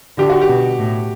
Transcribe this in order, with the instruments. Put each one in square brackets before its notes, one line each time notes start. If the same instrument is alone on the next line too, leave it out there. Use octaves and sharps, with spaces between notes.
[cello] D3 [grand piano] G4
[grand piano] F#4
G4
[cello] B2
A2